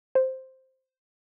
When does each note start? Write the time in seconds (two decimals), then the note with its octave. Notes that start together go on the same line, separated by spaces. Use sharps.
0.15 C5